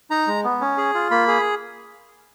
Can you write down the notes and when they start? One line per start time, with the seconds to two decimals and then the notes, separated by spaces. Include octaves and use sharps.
0.11 D#4 A#5
0.27 G#3
0.44 B3
0.61 C#4
0.78 G#4
0.94 F4
1.11 A#3 B5
1.28 G#4